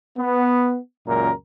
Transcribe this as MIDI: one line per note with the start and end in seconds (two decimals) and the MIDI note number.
0.17 0.77 59
1.07 1.30 37
1.07 1.30 42
1.07 1.30 46
1.07 1.30 70